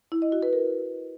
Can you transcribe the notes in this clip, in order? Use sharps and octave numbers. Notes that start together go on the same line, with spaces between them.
E4
D#5
F#4
B4
A#4